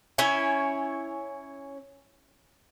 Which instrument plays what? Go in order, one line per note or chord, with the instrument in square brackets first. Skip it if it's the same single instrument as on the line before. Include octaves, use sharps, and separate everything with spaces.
[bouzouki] C#4 E4 C#5 G#5